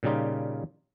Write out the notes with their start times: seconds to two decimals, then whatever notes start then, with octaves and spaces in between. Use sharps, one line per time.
0.03 A#2 C#3 G3 D#4 F4